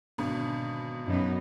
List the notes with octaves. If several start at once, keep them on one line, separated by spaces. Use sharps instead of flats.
G#1 B2 D3
F#2 B3 D#4